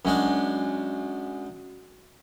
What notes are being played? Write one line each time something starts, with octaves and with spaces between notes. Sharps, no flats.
F#2 G#3 D4